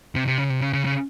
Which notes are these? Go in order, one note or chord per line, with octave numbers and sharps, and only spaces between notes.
C3
C3
C#3
C3
C#3
C#3
C#3